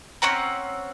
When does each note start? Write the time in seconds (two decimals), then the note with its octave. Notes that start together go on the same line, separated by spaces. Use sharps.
0.22 C4 C#4 F#5 A#5